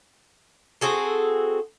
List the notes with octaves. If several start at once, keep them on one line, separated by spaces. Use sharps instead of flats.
C4 F#4 G#4 A4